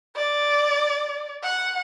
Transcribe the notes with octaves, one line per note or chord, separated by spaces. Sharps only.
D5
F#5